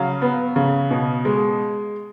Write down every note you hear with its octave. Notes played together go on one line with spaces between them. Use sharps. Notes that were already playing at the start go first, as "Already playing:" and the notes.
Already playing: C#3 F#3 F5
B3
C#3
B2
G#3